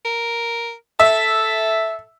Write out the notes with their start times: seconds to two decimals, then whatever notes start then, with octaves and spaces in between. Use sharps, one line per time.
0.05 A#4
1.00 A4 E5